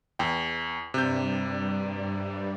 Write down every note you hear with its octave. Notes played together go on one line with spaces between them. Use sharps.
E2 G5
G2 C3 G3 G6